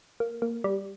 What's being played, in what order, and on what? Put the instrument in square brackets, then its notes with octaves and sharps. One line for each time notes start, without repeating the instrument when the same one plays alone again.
[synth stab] A#3
A#3
G3